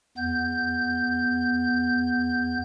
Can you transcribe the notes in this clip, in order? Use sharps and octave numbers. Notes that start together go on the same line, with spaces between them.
E2 B3 G6